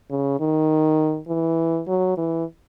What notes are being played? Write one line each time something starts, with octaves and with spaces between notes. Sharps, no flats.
C#3
D#3
E3
F#3
E3